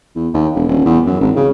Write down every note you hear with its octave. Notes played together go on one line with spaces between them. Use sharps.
E2
D#2
E1
D#1
E2
F#2
G#1
C#3